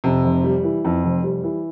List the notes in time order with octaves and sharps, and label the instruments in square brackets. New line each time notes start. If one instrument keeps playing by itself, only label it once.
[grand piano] F2 [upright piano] C3
[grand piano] F1
G3
E3
F2
F1
G3
E3